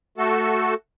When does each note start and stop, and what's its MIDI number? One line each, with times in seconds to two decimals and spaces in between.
0.18 0.74 57
0.18 0.74 66
0.18 0.74 69